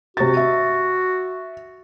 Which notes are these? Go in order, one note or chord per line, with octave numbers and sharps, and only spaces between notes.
C3 F#4 A6
E5